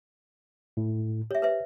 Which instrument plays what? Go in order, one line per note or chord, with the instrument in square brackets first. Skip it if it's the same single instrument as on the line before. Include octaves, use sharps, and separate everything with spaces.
[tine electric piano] A2
[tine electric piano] G4 [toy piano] C#5 E5
[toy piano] B4 C5 E5